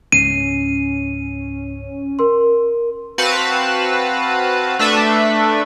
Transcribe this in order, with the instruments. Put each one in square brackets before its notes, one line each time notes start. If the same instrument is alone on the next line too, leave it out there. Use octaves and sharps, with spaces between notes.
[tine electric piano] C#2 G#2 C7 [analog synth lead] C#4 [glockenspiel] D#7
[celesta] A#4 C6
[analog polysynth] C4 F#4 B4 F5 A5
A3 D4 A4 B4 E5